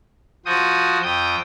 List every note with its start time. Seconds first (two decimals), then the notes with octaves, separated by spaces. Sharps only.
0.46 F3 F#4 C5 D#6
1.03 F2 G5 D#6 G6